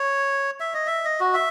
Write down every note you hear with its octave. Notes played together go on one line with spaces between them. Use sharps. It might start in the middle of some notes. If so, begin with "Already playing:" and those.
Already playing: C#5
E5
D#5
E5
D#5
F#4
E5